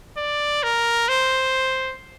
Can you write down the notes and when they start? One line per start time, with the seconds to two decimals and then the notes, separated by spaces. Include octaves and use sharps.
0.17 D5
0.63 A#4
1.09 C5